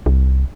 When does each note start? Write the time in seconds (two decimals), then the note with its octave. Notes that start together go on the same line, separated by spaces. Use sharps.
0.06 C2